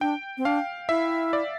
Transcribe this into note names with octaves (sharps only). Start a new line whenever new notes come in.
D4 G5
C4
D4 F5
E4 E5
D5